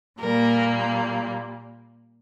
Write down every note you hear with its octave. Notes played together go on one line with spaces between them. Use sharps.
A#2 G3 A#3 A#4